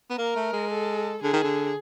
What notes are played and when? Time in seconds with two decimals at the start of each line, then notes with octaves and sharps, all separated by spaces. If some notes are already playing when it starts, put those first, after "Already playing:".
0.10 B3
0.18 A#3 A#4
0.36 A3
0.53 G#3
0.70 A4
1.23 D3 G#4
1.33 D#3
1.43 D3